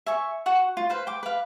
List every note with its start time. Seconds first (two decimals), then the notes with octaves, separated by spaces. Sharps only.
0.06 E5 G#5 C#6
0.46 F#4 F#5 C#6
0.77 F4
0.89 B4 C5 F5
1.07 G5 D6
1.23 B4 F5